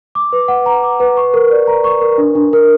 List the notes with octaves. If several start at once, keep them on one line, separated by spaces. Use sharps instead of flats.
D6
B4
F#5
A#5
D6
B4
C#6
A#4
D5
A#5
C#6
A#4
D4
D4
A#4